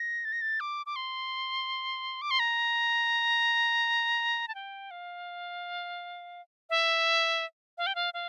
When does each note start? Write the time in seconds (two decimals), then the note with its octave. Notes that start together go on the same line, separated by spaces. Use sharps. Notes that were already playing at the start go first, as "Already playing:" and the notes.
Already playing: A#6
0.25 A6
0.32 A#6
0.41 A6
0.60 D6
0.86 D6
0.96 C6
2.22 D6
2.31 C6
2.39 A#5
4.48 A5
4.55 G5
4.91 F5
6.70 E5
7.78 F5
7.87 G5
7.95 F5
8.14 F5